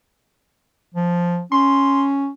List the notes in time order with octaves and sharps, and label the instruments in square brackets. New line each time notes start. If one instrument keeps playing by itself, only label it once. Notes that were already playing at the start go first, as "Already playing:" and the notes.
[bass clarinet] F3
[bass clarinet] C#4 [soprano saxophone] C6